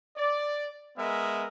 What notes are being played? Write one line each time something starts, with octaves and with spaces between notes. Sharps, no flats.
D5
G#3 B3 A#4 E5